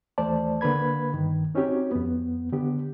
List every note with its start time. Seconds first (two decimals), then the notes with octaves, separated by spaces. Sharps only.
0.18 D#2 E3 A3 C5 D5 A5
0.61 D3 A#3 B4 B5 G#6
1.14 G2 D#3
1.55 C4 C#4 D#4 F#4 G4 C#5
1.91 F2 B3
2.53 D3 B3 G4